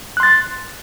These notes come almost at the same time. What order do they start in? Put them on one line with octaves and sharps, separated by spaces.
F#6 C6 A6